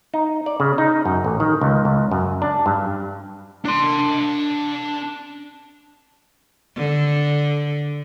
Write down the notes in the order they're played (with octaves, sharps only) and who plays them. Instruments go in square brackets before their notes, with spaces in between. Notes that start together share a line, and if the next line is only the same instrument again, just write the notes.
[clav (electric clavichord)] D#4
D5
C#3
D#4
F#2
A1
D#3
C#2
C#2
F#2
D4
G2
[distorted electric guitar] D4 C6
[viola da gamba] D3